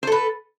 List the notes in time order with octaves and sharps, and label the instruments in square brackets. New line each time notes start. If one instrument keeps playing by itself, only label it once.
[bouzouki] C5
A4
B4